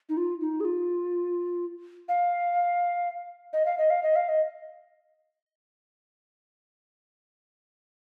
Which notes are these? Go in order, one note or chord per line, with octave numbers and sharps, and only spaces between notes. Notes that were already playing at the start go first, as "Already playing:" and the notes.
D#4
F4
D#4
G#4
F4
F5
D#5
F5
D#5
F5
D#5
F5
D#5